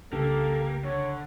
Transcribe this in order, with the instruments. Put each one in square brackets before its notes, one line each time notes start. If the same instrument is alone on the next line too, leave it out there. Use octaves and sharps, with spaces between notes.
[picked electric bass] C2 C#3 D4 [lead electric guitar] A#3 [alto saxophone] G4 [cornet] A4
[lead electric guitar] D3 [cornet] C#5